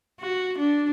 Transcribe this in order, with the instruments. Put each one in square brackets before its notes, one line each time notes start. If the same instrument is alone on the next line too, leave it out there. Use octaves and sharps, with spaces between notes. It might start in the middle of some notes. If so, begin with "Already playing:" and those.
[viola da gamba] F#4
D4